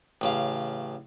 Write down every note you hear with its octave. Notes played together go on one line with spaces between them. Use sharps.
A1 C#3 F5